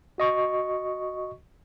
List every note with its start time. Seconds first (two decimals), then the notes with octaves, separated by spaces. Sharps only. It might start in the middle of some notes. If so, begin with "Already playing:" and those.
0.18 F#4 D#5 C#6